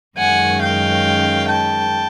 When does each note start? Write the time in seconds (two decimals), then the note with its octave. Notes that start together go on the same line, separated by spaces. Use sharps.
0.18 F#2 D#3 G#3 C#4 F#5 G#5
0.62 F5 G5
1.50 G5 A5